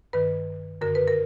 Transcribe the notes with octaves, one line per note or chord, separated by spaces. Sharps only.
G2 D#3 B4
F#2 D3 A#4
B4
A#4